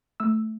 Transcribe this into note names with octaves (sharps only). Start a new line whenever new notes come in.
A3 E6